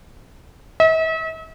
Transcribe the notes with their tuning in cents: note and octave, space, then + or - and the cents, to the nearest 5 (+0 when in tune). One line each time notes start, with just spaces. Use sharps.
E5 -45